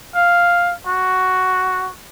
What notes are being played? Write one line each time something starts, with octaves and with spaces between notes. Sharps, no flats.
F5
F#4